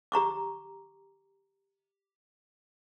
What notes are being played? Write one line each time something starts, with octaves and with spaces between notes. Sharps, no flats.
G4 A#5 C#6 D6